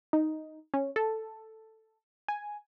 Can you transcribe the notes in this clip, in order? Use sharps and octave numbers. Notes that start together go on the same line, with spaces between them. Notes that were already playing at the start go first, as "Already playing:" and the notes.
D#4
C#4
A4
G#5